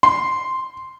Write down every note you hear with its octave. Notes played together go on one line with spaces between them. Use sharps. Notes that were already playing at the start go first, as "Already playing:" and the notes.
C6